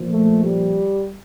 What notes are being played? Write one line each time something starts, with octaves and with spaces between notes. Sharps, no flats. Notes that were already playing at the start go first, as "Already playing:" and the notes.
Already playing: A#2 F3
A3
G3